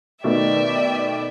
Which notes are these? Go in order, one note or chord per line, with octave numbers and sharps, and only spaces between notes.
B2 D#3 A3 D5 E5 G5